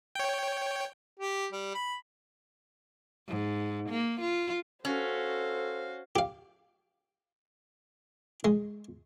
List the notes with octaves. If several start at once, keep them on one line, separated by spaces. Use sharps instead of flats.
C#5 G5
G4
G3
B5
G#2
A#3
F4
C#4 F#4 A4 C5 F5
G4 F5
G#3